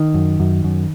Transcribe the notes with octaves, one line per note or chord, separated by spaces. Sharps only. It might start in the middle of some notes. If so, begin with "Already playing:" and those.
Already playing: D#3
F#2
F#2
F#2